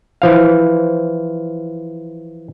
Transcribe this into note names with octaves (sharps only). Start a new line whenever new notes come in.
E3 F3 F5